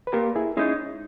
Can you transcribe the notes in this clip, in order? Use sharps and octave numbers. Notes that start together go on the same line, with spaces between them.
B4
A#2 G4 A#4
E4 G#4
G#3 C#4 D#4 E4